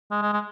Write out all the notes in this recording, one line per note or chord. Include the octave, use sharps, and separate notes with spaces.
G#3
G#3
G#3